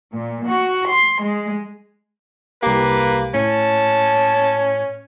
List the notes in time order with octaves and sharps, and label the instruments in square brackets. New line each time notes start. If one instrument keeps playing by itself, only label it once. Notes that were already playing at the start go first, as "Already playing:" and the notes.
[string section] A#2
F#4
C6
G#3
[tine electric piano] C2 G4 [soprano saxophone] A#3 [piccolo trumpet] B4
[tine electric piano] A2 [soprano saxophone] C#4 [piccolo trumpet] A5